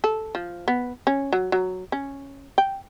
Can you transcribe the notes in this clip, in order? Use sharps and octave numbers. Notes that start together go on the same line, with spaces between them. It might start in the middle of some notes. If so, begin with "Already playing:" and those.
A4
F3
B3
C#4
F#3
F#3
C#4
G5